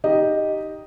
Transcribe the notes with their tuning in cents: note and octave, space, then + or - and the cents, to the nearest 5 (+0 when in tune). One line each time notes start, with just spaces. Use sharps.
D#4 +0 G4 +0 D#5 +0